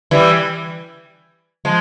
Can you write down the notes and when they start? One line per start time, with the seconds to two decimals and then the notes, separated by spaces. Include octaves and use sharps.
0.11 E3 G3
1.65 F3 G#3